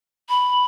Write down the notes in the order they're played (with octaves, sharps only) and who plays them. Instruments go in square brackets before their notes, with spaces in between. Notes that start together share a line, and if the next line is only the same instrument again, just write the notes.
[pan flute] B5